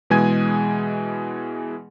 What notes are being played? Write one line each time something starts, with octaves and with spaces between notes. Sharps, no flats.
B2 E3 G#3 G#4 G#5 G#6